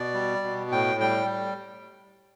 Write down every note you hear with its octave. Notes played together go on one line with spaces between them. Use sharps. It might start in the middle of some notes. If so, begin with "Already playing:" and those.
Already playing: B2 D5
G3
B2
A2 G5
G3 G5